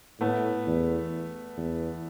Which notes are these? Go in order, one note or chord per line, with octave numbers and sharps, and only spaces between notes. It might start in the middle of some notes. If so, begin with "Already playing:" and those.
A2 A3 B3
E2
E2